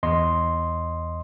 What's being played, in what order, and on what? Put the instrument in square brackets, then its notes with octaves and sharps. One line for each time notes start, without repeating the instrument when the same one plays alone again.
[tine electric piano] E2 D#5 C6